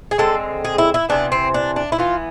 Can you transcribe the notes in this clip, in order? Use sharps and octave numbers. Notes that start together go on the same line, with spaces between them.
G#4
D3 G#3 C4 A4
G#4
E4
E4
C3 E3 B3 D4
C4
D4
D4
E4
E3 B3 F4